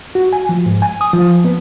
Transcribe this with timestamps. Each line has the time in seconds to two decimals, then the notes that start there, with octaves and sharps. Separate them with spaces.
0.15 F#4
0.33 G#5
0.49 F3
0.66 G#2
0.82 G#5
1.01 D#6
1.13 F3
1.44 B3